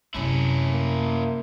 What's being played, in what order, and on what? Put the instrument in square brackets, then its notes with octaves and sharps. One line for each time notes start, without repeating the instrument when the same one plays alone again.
[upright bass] F#2 C3 [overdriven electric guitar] C#4 E4
[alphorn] A#3